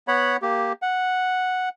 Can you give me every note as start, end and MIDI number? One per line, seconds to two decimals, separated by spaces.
0.08 0.37 59
0.08 0.37 73
0.08 0.37 78
0.08 0.37 83
0.42 0.73 58
0.42 0.73 67
0.82 1.69 78